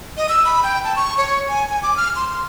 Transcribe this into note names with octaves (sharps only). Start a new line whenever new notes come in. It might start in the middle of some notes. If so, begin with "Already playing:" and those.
D#5
E6
B5
G5
A5
C#6
C#5
G#5
G#5
D6
F6
C6